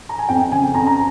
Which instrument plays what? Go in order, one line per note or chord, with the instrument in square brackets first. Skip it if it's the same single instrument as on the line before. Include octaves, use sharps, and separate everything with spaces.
[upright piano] A#5
G#5
F2 G5
C#3 G#5
F2 A#5
A#5